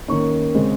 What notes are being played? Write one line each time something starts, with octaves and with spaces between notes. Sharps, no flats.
D#3 A#3 C#4 C#6
C#3 G#3 C4